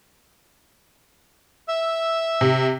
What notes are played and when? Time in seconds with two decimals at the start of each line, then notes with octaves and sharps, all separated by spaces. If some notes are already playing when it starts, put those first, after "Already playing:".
1.68 E5 E6
2.41 C3